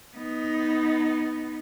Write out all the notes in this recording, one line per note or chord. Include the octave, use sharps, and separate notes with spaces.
B3 D#4